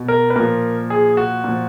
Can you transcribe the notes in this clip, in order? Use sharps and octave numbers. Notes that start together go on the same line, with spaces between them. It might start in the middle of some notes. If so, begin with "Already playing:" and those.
Already playing: B2
A#4
B4
A#2 F3 A#4
G#4
F#4
A#2 F3